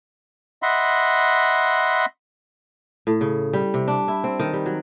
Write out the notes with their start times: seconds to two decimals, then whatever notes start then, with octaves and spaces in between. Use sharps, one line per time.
0.63 D#5 E5 F#5 B5 C6
3.07 A2
3.21 C#3
3.53 G3
3.74 C3
3.88 D4
4.08 E4
4.24 C4
4.40 D#3
4.53 G3
4.66 F#3